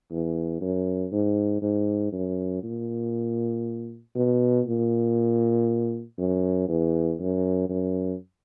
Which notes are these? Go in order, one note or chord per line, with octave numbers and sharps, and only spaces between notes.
E2
F#2
G#2
G#2
F#2
A#2
B2
A#2
F#2
E2
F#2
F#2